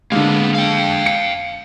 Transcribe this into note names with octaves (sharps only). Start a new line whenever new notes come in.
D3 G#3 A#3 B3
F5 G5
C#7